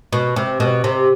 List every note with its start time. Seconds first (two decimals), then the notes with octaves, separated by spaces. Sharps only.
0.13 B2
0.36 C3
0.60 B2
0.84 C3